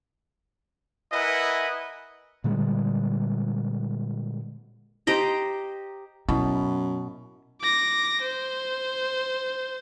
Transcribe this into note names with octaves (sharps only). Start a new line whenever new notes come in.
E4 A#4 B4 D#5 F#5 G#5
A#2 D3 G3 G#3
G4 C5 D#5 A#5
F#2 B2 E4
D6 A#6
C5